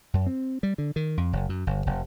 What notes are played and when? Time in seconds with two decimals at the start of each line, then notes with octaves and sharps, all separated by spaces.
0.14 F#2
0.26 C4
0.63 G3
0.78 D3
0.96 D#3
1.17 F2
1.33 F#1
1.49 F#2
1.67 G1
1.86 F1